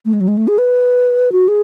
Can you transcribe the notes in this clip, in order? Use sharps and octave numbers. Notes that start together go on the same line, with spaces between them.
A3
G#3
F#3
G#3
A3
G#4
B4
F#4
G#4